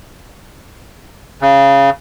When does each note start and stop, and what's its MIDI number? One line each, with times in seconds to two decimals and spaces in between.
1.42 1.90 49